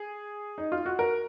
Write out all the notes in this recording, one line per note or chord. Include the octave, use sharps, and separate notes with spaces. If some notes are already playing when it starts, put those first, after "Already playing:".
Already playing: G#4
D#4
F4
F#4
A#4